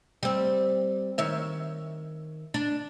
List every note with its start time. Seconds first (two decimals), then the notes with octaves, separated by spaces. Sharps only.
0.23 G3 C4
1.18 D#3 C#5 E5
2.54 D4